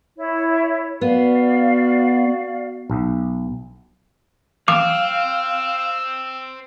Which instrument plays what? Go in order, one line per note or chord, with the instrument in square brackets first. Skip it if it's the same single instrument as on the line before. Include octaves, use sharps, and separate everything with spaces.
[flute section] E4 C#5
[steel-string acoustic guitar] B3 [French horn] F#4 [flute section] D5 F5
[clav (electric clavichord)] B1
[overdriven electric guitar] C4 [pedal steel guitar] F5 [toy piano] D6 [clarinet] E6